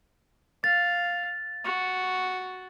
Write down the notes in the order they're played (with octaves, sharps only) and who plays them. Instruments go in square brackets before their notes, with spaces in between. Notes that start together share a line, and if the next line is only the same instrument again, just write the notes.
[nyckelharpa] F5 [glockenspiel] A6
[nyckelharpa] F#4